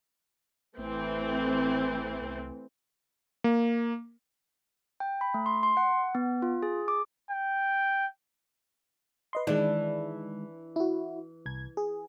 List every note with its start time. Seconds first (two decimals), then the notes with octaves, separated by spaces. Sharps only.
0.78 A1 E3 A3 C4
2.21 C2
3.44 A#3
5.00 G5
5.21 B5
5.34 A3
5.46 C6
5.63 C6
5.77 F#5
6.15 B3
6.42 F4
6.63 G#4
6.88 D6
7.31 G5
9.33 B4 D#5 C6
9.47 D#3 E3 G#3 D4
10.76 E4 F#4
11.46 C2 G#6
11.77 G#4